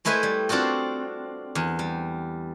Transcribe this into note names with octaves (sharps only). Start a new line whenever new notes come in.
G#3 A3 E4 B4 C5 G#5
G3
C4 D4 F4 F#4 A4
E2
G3